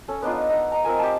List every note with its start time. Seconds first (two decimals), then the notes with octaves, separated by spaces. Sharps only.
0.08 C#4 A4
0.22 B3 D4 D#4 F4
0.49 D#4 F#5
0.72 D#4 A#5
0.84 C4 F4 A#4 G#5
0.99 G4 A5